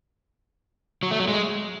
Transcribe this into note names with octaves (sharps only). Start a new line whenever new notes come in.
F#3
A3
F#3
G#3